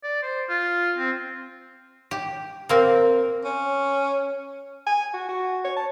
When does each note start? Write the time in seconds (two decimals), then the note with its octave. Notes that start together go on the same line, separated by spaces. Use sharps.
0.03 D5
0.22 C5
0.49 F4
0.98 C4
2.11 G4
2.69 A#3 C4 A#4
3.44 C#4
4.87 G#5
5.14 F#4
5.29 F#4
5.65 C#5
5.77 A5